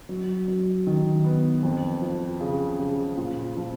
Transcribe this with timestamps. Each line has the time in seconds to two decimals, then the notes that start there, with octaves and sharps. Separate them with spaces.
0.09 F#3
0.48 F#3
0.87 D#3
1.24 B3
1.63 F2
2.02 F3
2.40 C#3
2.79 C#3
3.17 A#2
3.57 F3